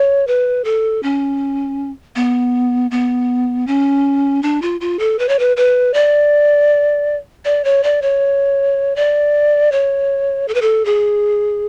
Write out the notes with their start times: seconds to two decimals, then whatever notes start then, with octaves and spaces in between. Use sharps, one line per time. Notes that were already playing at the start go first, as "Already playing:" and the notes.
Already playing: C#5
0.27 B4
0.64 A4
1.03 C#4
2.16 B3
2.91 B3
3.67 C#4
4.43 D4
4.62 F4
4.81 F4
4.99 A4
5.19 B4
5.29 C#5
5.39 B4
5.57 B4
5.94 D5
7.45 D5
7.64 C#5
7.83 D5
8.02 C#5
8.96 D5
9.72 C#5
10.48 A4
10.54 B4
10.62 A4
10.85 G#4